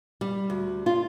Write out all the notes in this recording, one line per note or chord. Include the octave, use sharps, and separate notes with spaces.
G3
D2
F4